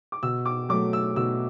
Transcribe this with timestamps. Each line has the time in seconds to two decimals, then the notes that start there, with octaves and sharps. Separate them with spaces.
0.12 D6
0.23 B2 E6
0.46 D6
0.69 F#3 A3 D6
0.93 E6
1.16 B2 E6